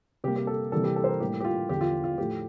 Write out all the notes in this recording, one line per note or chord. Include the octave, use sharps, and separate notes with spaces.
C3 G3 A#3 G4
G4
A4
C3 E3 G3 A#3 A4
G4
A4
C5
A#4
A2 G3 A#3 G4
G4
F4
E2 D3 F3 G4
F4
F4
A2 F3 A3 G4